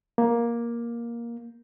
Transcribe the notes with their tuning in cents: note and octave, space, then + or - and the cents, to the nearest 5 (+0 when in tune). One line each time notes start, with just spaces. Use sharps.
A#3 +10